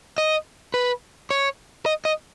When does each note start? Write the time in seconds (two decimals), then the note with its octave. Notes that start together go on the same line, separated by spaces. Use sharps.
0.18 D#5
0.74 B4
1.31 C#5
1.86 D#5
2.05 D#5